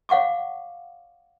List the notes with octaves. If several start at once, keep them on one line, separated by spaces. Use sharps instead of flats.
C#5 F5 F#5 C#6 D6